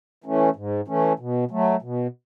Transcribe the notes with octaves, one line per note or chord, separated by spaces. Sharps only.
E3 A3 C#4
G#2
E3 A3 C#4
B2
F#3 A3
B2